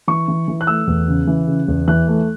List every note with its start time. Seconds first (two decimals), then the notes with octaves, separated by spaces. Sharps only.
0.08 E3 C#6
0.28 E3
0.48 E3
0.61 F#6
0.67 A3 E6
0.87 E2
1.08 C#3
1.27 E3
1.48 C#3
1.68 E2
1.88 E3 F#6
2.08 A3